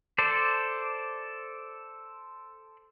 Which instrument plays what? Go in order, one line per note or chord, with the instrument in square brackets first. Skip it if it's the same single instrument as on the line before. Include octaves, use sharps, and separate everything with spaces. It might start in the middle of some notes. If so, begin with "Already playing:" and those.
[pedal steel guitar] A4 C5 D5